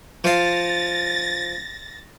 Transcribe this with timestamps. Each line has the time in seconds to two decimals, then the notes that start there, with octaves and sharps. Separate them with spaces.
0.24 F3 F5 A6 A#6